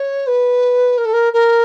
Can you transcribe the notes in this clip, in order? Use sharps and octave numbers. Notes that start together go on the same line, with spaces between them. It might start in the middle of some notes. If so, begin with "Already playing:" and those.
Already playing: C#5
B4
A#4
A4
A#4
A#4